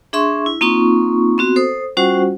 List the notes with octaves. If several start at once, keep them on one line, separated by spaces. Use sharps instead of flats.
D4 G#4 E5 C6 C#6
E4
A#3 C4 D#4 F4 C#6
B3 C4 F#4
A4 C5 D#6
G3 C#4 F4 F#4 C5 F#5